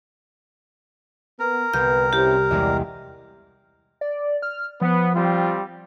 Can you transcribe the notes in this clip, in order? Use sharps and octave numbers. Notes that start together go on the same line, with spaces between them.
B3 A#4
C2 B3 B4 G6
C3 C#4 E4 G4
E2 G#3 C4 D5
D5
F6
F3 B3
G3 C4 F4